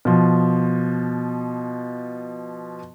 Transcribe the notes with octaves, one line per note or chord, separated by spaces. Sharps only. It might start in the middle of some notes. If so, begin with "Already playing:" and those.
B2 F3